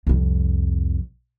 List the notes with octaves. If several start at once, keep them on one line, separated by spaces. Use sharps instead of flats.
C2 F2